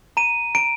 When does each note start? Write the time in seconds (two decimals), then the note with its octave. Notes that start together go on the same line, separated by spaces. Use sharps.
0.17 A#5 D#7
0.55 A#5 D7